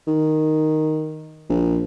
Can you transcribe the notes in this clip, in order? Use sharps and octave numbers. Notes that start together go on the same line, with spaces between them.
D#3
A#1